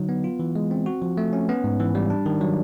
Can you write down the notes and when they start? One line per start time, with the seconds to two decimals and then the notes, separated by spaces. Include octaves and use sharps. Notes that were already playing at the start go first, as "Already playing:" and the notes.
Already playing: D3 F#3 D#4
0.09 B3
0.24 F4
0.40 E3
0.56 G#3
0.71 C4
0.86 F#4
1.02 F3
1.17 A3
1.33 C#4
1.49 B3
1.64 G#2
1.80 E3
1.95 G3
2.10 D4
2.26 D#3
2.41 F#3